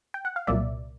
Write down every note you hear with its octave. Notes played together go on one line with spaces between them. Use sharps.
G5
F#5
F5
C2 A#2 F#3 A#3 D5 E5